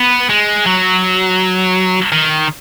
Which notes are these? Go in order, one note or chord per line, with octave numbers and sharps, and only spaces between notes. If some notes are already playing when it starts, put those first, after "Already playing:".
Already playing: B3
G#3
F#3
D#3